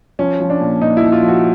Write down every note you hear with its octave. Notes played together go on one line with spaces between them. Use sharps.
F3 C#4
F3
D4
A#2
A#2 D#4
E4
F3
F4
F3
F#4